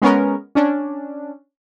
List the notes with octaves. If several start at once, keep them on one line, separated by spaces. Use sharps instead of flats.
G#3 B3 C#4 A#4
C#4 D4